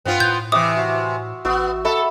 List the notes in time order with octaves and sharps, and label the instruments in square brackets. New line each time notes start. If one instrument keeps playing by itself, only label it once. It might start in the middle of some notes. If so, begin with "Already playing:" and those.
[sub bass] G2 [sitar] B3 C4 F4
[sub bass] A2 [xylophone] G6
[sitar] C3 E3 [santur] E5 [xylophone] D6 D#6
[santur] F#4
[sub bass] A1 [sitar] B3 [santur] F#4 E6
[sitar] A4 [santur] E5 F#5 B5